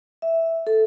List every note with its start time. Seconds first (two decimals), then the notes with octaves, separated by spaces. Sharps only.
0.22 E5
0.67 A4